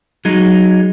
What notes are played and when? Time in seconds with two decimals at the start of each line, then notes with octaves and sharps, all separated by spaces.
0.25 F#3 G#3 D#4